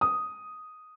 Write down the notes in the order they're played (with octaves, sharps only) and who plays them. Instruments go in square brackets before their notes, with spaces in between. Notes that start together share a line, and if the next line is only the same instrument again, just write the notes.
[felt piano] D#6